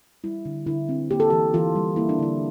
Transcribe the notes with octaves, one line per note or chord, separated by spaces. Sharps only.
G3 E4
D3
D3 E4
C4
A#3 G4
A4
E3 G4
E3 F4
G3
A#3 E4
D4
D3 E4